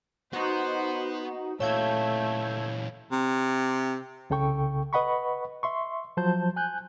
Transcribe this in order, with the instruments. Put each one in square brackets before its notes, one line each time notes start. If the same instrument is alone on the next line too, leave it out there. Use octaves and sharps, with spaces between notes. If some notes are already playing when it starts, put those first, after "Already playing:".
[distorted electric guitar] B3 [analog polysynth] D#4 F#4 [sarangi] C5
[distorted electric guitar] A#2 E3 [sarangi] A3 [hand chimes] C#5 F5 [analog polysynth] E6 G6 G#6
[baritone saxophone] C3
[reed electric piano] C2 C#3 A4 G5 C#6
B4 D#5 F#5 B5 C#6
E5 C6 C#6
F3 F#3 C5 A5 G6
G#5 F#6 G6